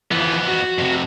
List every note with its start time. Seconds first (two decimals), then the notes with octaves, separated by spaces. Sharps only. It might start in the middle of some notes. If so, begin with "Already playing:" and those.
0.11 F2 E3 F3 B3
0.49 F#4
0.78 F2 C3